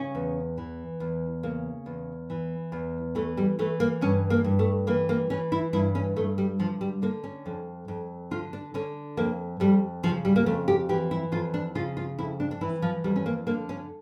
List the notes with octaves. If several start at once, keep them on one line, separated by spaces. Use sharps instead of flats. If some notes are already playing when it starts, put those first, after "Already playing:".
Already playing: C#3 C#4
E2
E3
E2
C#3 A#3
E2
E3
E2
E3 A3
G3
E3 A3
A#3
G2 C#4
A#3
G2
A3
E3 A#3
A#3
E3 C#4
E4
G2 E4
C#4
G2 A3
G3
D3 F3
G3
D3 A#3
C#4
F2
F2
D3 F4
D4
D3 C#4
F2 A#3
F2 G3
C#3 F3
G3
A#3
F2 A3
G4
E3 G4
E4
F2 F4
D4
C#3 F4
F4
F2 E4
D4
D4
E3 E4
F3
F2 G3
C#4
A#3
D3 A#3
C#4